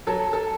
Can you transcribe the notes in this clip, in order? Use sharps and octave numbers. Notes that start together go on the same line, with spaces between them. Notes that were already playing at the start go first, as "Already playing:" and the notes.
F#3 A4
A4